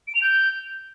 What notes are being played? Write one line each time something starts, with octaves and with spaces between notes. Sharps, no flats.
D7
F7
G6